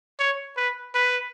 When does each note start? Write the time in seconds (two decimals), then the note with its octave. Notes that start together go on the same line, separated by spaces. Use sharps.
0.19 C#5
0.57 B4
0.95 B4